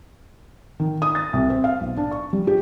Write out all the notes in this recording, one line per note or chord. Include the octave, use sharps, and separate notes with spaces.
D#3
D#6
A6
C2
C4
F5
B1
D4
C#6
G3
G4